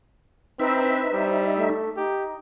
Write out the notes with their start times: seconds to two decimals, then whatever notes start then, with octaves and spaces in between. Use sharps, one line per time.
0.60 C4 D#4 B4 E5
1.13 G3 C5
1.56 A3
1.97 D#4 G4